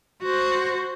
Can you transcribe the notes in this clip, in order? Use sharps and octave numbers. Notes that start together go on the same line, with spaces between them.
F#4 C5